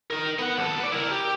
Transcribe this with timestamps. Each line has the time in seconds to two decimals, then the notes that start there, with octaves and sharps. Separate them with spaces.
0.11 D#4 A#4
0.39 B3 F#5
0.58 D#2 A4
0.80 B4 D5
0.92 E4 A#4
1.11 G4